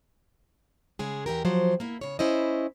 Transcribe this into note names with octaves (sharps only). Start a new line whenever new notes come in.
C#3 G#3 G#4
E2 E3 G4 A#4
F3 F#3 C5
A#3 E4
C#3 C#5
C#4 E4 C5 D#5